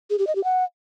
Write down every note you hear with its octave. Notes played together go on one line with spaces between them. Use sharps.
G#4
G4
D#5
G4
F#5